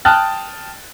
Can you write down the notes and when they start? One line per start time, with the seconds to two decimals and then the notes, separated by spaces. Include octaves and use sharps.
0.05 G5 A5 D#6 F6 F#6 A6